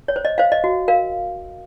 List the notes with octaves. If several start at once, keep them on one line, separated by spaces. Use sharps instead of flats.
C#5
C5
D#5
C5 F5
D#5
F#4
A#4 F5